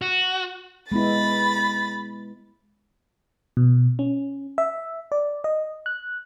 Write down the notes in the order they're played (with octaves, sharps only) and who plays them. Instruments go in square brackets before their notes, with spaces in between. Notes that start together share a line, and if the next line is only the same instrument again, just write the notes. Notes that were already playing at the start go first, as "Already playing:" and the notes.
[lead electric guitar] F#4
[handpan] G#3 B3 E4 [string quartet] B5 A6
[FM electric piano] B2
C#4
E5
D5
D#5
F#6